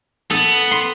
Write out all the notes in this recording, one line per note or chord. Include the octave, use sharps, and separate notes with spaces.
B3 A4 A5
C6